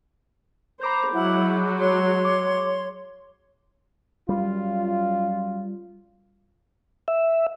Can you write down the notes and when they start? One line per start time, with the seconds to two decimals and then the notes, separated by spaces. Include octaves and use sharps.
0.81 C5 A#5 B5 D6 G6
1.13 F#3 G#3 E4 F#5
1.78 C#5 C6
2.24 D6
4.29 F#2 G3 F4
7.08 E5